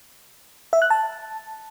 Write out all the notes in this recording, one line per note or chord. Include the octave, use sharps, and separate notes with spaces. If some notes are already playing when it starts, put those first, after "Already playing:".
E5
F#6
A5